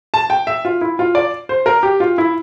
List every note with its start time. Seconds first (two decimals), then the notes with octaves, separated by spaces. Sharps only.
0.14 A5
0.30 G5
0.47 E5
0.65 F4
0.81 E4
0.99 F4
1.15 D5
1.49 C5
1.66 A#4
1.83 G4
2.00 F4
2.18 E4